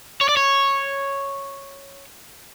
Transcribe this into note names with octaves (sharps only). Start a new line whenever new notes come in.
C#5
D5
C#5